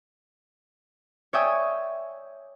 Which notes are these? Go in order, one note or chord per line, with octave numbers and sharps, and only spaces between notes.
C#5 D5 E5 G5 G#5 D#6